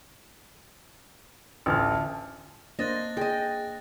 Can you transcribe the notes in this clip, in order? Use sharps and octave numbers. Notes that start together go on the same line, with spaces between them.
A1 D2 F4 A4 F6
A#3 D4 C5 D#5 F#6 A6 A#6
G#4 D#5 G5